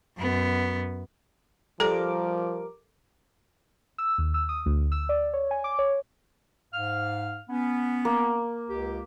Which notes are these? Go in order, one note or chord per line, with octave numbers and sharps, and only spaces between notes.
F#2 B3
F3 G3 A4 A#4 D6
E6
D#2
E6
D#6
D2
E6
D5
C#5
G#5
D6
C#5
G#2 F5 F6
B3 C#4
A#3
C#2 G4